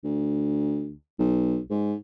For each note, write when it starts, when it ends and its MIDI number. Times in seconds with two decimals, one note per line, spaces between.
0.05 0.93 38
1.19 1.59 35
1.70 1.95 44